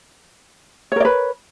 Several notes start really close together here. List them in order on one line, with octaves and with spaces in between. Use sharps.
C#5 A#4 D5 B4